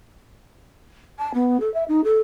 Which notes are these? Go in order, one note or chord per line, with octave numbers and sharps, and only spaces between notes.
A5
B3
A4
E5
D#4
A4